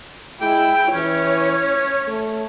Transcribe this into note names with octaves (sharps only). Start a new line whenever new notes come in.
G#3 E4 G5
E3 C#4 C#5
A3